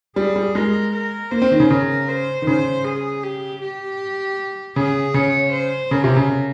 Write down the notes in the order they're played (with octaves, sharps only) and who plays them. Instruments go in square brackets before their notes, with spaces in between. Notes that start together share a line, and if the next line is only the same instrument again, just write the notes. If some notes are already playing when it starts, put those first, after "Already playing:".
[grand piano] G3 [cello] G#4
[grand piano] G3
[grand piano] G#3 [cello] A#4
[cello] A#4
[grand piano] A#3 [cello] C5
[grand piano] C4
D#3
C#3
[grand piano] C#3 [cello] A#4
[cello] C5
[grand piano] D#3
[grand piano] C#3 [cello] C5
[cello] G#4
G4
G4
[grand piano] C#3 [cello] G#4
[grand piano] C#3 [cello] C#5
[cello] C5
[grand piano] C#3 [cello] A#4
[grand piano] C3
C#3